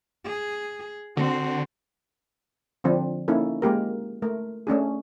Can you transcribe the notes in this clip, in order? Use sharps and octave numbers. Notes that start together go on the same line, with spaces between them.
G#4
D3 C4 F#4
D3 F3 C4 D4
A#3 C#4 D#4 E4 A4
G#3 A#3 G4 A#4
A3 A#4
A3 C#4 D4 G#4